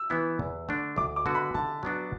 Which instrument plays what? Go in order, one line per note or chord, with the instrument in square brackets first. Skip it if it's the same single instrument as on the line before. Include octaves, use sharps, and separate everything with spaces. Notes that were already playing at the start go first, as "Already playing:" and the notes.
Already playing: [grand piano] E6
[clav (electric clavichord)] E3 B3 E4
E2
D3 A3 D4
[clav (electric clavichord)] D2 [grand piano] D6
[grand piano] D6
[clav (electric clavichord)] D3 B3 F#4
[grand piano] B5
[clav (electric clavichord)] D3 [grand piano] A5
[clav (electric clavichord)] F#3 B3 D4 F#4